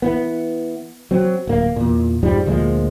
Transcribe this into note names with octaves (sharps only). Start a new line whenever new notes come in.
E3 B3
F#3 C4
D1 A#3
E2 A#2
F2 G#2 F3 G3
D2 A#2 F3 G#3